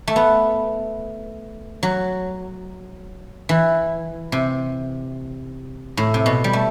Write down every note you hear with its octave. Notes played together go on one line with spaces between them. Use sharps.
A3
B3
F#3
E3
C3
A2
C3
B2
G3
A3